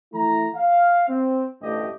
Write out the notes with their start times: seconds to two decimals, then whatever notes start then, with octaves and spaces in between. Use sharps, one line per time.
0.13 E3 A3 E4 A#5
0.55 F5
1.09 C4
1.62 A1 D2 G2 A3 G4 D#5